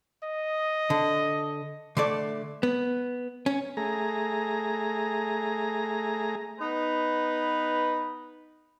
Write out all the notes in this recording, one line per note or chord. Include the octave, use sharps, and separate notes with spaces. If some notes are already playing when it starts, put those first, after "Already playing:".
D#5
D3
D3 A3 D5
B3
C#4
A3 G#4 A#5
B3 D#4 B4